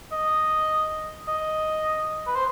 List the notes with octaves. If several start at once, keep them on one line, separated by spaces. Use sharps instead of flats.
D#5
D#5
B4
C5